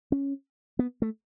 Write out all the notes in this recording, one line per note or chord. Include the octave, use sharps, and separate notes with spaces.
C#4
B3
A3